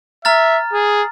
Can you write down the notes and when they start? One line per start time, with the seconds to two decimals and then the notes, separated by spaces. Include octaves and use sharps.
0.25 E5 A#5 F6 A6
0.73 G#4